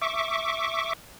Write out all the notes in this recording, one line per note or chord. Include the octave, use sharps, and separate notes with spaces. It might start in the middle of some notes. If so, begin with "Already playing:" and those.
E5 C#6 D6